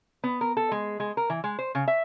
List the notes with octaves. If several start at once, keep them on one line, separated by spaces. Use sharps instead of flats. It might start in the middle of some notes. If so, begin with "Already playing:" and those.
B3
A#4
A4
G#3
G#3
A#4
E3
G#3
C5
C#3
E5